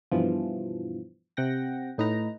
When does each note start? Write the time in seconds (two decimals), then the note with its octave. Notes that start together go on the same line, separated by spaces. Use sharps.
0.12 G2 B2 E3 F3
1.37 C3 F#5 G5 A#6
1.98 A2 D#4 B4 A#5